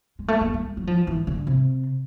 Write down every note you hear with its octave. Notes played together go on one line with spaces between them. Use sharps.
G#3
A3
A#3
G#3
F#3
F3
E3
D3
C3